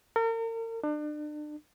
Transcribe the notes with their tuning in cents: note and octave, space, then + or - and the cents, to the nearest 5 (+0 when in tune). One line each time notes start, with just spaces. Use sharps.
A#4 -40
D4 +35